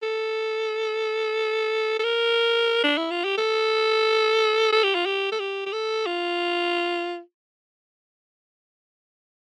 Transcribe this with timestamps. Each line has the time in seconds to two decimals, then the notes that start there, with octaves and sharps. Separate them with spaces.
0.03 A4
1.99 A4
2.04 A#4
2.84 D4
2.97 E4
3.11 F4
3.24 G4
3.38 A4
4.73 A4
4.84 G4
4.95 F4
5.06 G4
5.32 A4
5.40 G4
5.66 G4
5.73 A4
6.06 F4